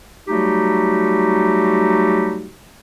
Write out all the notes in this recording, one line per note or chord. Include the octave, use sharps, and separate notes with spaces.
F#3 G3 A3 D#4 F#4 G4